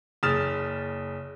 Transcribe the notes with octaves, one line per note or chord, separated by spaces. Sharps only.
F#1 D#6 F6 A6 E7